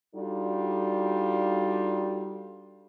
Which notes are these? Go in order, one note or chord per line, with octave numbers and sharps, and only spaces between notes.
G3 D4 D#4 F4 F#4 A4